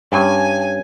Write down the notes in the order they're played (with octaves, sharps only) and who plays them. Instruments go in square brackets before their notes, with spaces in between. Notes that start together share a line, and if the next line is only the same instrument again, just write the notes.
[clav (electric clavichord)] G2 C#4 [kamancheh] G#5